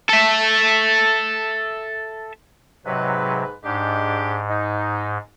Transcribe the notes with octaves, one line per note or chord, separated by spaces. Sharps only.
A4 E5
G#2 C3 F#3 B4
G#2 G#3 D4 G4
D#4